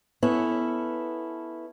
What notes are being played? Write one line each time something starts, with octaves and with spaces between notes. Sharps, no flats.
B3 C#4 E4 A4